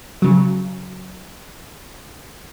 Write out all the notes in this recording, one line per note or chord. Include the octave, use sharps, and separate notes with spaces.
C#3 F#3